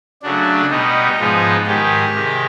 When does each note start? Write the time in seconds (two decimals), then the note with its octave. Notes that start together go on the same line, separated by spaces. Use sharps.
0.22 C#3 F#3 A3 D4
0.70 B2 G3 B3 D#4
1.19 G#2 F3 G#3 B3
1.66 G#2 D#3 G#3 G4
2.14 C3 D#3 G#3